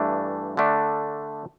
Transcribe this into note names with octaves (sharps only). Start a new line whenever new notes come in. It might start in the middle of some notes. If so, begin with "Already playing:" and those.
Already playing: G2 E3 A3 D4
D3 A3 D4